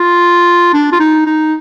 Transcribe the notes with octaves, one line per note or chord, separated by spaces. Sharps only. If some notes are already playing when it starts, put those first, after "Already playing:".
Already playing: F4
D4
F4
D#4
D#4